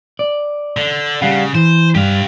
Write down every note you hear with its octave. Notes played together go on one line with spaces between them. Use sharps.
D5
D3
C#3 G3 F5 F#5
E3 C5
G2 G4 F5